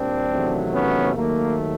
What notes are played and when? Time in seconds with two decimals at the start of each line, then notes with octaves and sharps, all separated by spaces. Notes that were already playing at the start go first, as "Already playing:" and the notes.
Already playing: A#2 G3 A#3 C4 D4
0.30 E2 C3 D#3 F#3 A3
0.72 B3 C#4
1.16 D#2 D#3 F#3 A3 A#3